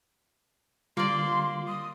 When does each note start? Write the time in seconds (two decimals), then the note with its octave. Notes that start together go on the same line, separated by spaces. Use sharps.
0.97 D3 G3 A#3 F4 D5 C6
1.67 D#6